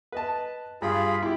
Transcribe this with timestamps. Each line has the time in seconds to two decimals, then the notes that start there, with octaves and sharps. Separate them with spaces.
0.12 B4 D#5 A5
0.82 G2 F4 G#4 B5
1.22 E4 G4